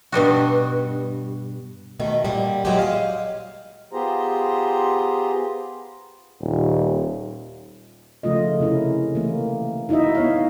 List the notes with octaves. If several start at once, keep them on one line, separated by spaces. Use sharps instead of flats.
G2 B2 G3 F#4
B2 D#3 A3 A4
A#2 D3 G3
A#2 F#3 G#3 E4 F#4 G4
D#5 F5
B3 F4 G4 G#4 C5 A#5
D#1
C#3 F3 A3 F4 D#5
C3 C#4 E4 A#4
E3 A3 A#3
D#4 E4 F#4 D#5 E5
B3 C#5 F5